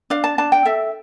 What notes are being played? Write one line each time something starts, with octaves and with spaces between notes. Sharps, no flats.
D4 F5
A5
D4 A5
G5
A4 E5